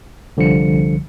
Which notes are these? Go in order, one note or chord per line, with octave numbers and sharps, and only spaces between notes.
C2 D3 F3 G3 C#7